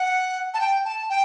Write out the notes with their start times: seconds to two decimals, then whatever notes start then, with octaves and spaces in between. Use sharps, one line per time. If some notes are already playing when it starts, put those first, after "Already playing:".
Already playing: F#5
0.54 A5
0.60 G5
0.85 A5
1.10 G5